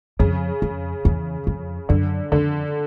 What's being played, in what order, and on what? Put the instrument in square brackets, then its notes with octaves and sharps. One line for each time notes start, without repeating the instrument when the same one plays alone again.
[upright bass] F2 [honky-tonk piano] C#3
[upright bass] F2
E2
F2
[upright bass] F#2 [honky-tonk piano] D3
[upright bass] F2 [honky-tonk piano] D3